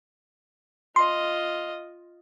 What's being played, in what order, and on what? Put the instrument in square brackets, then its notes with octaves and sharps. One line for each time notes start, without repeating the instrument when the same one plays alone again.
[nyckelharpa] F4 D#5 [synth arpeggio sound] C6